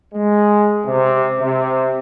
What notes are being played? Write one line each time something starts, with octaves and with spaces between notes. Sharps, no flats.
G#3
C3
C3